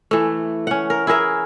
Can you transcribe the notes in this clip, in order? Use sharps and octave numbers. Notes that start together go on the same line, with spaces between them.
E3 A3
C#4 F#5
A#4
E4 G#4 A#4 E5